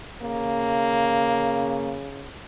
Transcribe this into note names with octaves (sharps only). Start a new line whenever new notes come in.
C#3 A#3